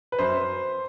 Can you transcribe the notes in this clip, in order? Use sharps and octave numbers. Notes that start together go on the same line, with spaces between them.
B4
F#2 C5